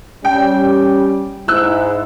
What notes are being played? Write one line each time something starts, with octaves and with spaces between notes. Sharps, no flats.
G3 C#4 G5
G#2 E4 E6 F#6